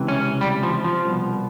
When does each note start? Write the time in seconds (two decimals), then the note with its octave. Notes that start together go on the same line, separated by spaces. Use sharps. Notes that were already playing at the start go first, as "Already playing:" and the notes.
Already playing: C#2 C3 E3
0.08 C#4
0.41 G3
0.63 F3
0.84 F3
1.05 C2 B2